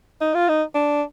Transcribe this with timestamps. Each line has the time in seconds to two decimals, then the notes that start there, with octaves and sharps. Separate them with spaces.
0.21 D#4
0.34 F4
0.49 D#4
0.75 D4